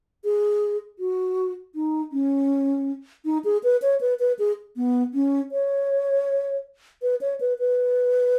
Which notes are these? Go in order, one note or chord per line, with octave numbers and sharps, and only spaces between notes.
G#4
F#4
D#4
C#4
D#4
G#4
B4
C#5
B4
B4
G#4
B3
C#4
C#5
B4
C#5
B4
B4